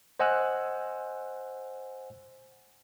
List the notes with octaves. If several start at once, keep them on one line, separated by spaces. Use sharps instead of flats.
C5 D#5 F#5 G#5 E6 F#6